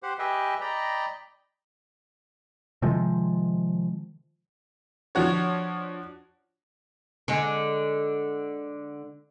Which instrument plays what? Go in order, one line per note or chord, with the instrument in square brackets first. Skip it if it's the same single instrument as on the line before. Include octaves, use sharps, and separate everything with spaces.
[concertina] G4 C5 F#5
G4 G#4 B4 D#5 E5 G5
D5 D#5 G5 A#5 B5
[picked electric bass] C3 D#3 F3 G#3
[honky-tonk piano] F3 D4 F#4 C#5
[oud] D3 G#3